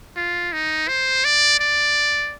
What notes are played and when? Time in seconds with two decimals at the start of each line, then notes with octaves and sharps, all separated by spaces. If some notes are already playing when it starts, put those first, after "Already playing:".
0.16 F4
0.52 D#4
0.88 C5
1.24 D5
1.60 D5